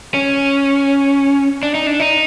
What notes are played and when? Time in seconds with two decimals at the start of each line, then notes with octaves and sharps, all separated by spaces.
0.14 C#4
1.63 D4
1.75 D#4
1.87 D4
2.00 D#4